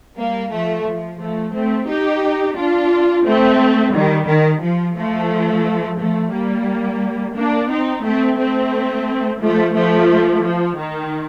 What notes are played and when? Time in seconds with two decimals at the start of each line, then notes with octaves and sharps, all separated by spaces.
0.18 G3 A#3
0.52 F3 A3
0.86 F3
1.21 F3 A3
1.54 A3 C4
1.89 D#4 G4
2.57 D4 F4
3.26 A3 C4
3.94 D#3 G3
4.28 D#3
4.62 F3
4.97 F3 A3
5.99 F3 A3
6.33 G3 A#3
7.36 A#3 D4
7.70 C4 D#4
8.04 A3 C4
8.39 A3 C4
9.41 F3 A3
9.75 F3 A3
10.43 F3
10.78 D#3